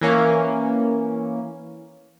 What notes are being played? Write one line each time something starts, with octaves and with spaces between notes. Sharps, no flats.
E3 A#3 C#4